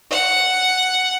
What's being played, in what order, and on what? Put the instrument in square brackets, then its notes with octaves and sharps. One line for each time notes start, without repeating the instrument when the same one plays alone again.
[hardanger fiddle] F#5